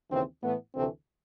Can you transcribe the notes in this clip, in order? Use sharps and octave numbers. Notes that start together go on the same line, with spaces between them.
D#2 C#3 E3 C4
A2 E3 A3 B3
D2 C3 E3 A3 C4